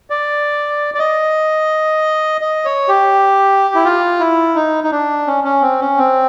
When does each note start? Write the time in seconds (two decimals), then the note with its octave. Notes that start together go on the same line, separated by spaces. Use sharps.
0.10 D5
0.94 D5
0.99 D#5
2.41 D#5
2.65 C#5
2.88 G4
3.75 E4
3.85 F4
4.20 E4
4.55 D#4
4.84 D#4
4.91 D4
5.27 C#4
5.44 C#4
5.62 C4
5.80 C#4
5.97 C4